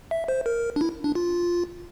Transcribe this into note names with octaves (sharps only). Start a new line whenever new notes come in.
E5
C5
A#4
D4
E4
D4
F4